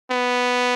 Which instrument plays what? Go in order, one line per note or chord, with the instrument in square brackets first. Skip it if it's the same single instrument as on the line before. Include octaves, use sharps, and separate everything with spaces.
[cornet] B3